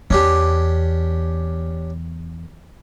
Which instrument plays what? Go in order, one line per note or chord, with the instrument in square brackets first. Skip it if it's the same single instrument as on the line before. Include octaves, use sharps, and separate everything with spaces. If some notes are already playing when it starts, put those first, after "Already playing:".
[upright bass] E2 [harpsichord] C#4 D4 G4